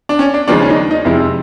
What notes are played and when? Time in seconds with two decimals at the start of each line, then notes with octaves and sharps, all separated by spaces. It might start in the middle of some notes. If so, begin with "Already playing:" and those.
0.09 D4
0.19 C#4
0.34 D4
0.48 D#2 C#3 F3 G#3 D4
0.62 C#4
0.70 D#4
0.76 D4
0.91 D#4
1.05 F2 C3 F3 G#3 E4